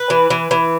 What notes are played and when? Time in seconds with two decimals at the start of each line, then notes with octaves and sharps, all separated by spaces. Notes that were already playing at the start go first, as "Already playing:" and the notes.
Already playing: B4
0.10 E3
0.30 E3
0.51 E3